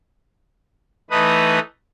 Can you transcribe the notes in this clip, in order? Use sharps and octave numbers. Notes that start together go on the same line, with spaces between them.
E3 A3 D#4 B4 D#6